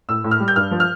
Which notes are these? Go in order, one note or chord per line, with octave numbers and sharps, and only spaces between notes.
A2 E6
A2
F6
G3
G6
G2 F6
F3
F6